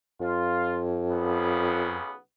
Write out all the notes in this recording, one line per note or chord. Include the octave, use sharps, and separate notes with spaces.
F2 F4
B1 C#3 B3